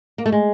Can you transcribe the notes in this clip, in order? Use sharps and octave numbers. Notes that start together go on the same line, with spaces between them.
A#3
A3
G#3